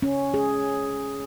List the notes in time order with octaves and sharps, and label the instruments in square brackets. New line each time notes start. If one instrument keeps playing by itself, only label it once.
[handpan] C#4
G#4